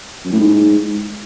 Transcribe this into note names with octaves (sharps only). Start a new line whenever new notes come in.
F#2
A2
G#2